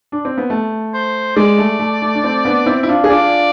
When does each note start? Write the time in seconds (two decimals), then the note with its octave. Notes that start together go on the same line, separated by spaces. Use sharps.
0.12 D4
0.25 C4
0.38 B3
0.50 A3
0.94 C5
1.37 G#3 D5
1.58 A3
1.79 A3
2.02 A3
2.15 D4
2.24 A3 C4
2.45 B3 D4
2.66 C4 E4
2.83 E4
2.89 D4 F4
3.04 G#4
3.10 D4 F4 D5